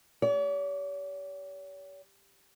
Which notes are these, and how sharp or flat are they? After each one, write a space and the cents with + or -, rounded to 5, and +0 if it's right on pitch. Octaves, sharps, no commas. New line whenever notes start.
G4 +0 C#5 +45